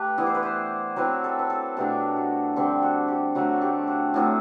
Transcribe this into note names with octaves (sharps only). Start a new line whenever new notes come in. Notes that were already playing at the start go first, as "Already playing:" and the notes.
Already playing: A3 G4 B4
E3 B3 E4 D5
C5
B4
C5
F#3 C4 E4 B4
A4
B4
A4
B2 F#3 A3 D4 G4
F#4
D3 G3 C4 G4
F#4
G4
D3 F#3 A3 F#4
G4
F#4
A2 F#3 A3 C4